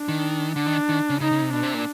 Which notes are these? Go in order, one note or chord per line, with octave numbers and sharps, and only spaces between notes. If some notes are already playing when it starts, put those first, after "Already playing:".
Already playing: D4
D#3
D3 D4
D#3
D#3
C#3
C#3 D#4
C#3
C3
B2 D4
C3
A#2